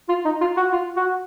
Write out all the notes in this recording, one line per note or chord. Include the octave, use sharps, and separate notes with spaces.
F4
D#4
F4
F#4
F4
F#4